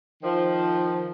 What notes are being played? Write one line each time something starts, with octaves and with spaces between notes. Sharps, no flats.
D#3 F3